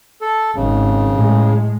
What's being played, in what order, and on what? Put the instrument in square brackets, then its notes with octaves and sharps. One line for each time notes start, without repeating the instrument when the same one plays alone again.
[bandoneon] A4
[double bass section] G#1 [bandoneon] C#3
[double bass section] A2 G#3